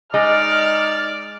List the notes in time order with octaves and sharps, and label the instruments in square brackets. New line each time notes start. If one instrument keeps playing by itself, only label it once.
[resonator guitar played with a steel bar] G#3 [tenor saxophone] D#4 [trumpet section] D5 [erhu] F6